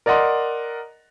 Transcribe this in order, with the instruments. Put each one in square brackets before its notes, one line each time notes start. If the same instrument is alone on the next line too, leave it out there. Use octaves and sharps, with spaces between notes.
[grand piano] A#4 D5 D#5 F#5 C6